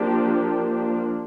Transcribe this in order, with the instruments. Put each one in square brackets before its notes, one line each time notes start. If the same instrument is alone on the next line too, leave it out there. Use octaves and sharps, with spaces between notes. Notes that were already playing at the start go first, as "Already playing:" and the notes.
Already playing: [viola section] F3 A#3 D4 G4